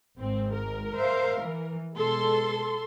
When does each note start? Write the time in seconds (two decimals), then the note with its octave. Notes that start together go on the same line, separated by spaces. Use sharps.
0.19 G#1 G#2 C4
0.53 A#4
0.96 C5 E5 F5
1.43 E3
1.96 B2 G#3 A4 C6